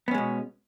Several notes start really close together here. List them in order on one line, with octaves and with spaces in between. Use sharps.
B3 C#4 G#3 B2